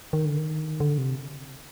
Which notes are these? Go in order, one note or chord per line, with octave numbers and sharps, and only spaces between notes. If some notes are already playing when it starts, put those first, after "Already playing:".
D#3
D3
D#3
D3
C3